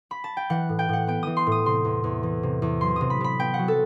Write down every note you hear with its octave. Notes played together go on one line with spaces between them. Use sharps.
B5
A5
G5
E3 F#5
A2
G5
A2 F#5
B3 G5
E3 D#6
C6
A2
D#6
C3 C6
E2
E2
E3
C3
E2
F#3 C6
C3 D#6
B5
C3 B5
B3 G5
F#5
F#3
A4